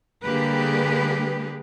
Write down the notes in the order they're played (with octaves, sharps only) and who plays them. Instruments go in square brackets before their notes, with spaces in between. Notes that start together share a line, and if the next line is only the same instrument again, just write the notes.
[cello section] D3 G3 A#3 G4 G#4 B4